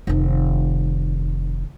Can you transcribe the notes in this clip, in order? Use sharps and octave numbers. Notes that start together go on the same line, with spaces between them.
F1 D#3